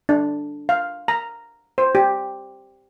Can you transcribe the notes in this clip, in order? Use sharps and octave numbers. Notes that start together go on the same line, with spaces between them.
D4
F5
A#5
C5
G4